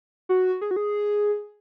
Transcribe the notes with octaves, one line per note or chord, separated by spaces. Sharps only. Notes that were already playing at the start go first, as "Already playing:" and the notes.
F#4
G#4
F#4
G#4